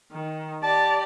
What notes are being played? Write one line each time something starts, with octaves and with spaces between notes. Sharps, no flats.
D#3
G4 D5 A5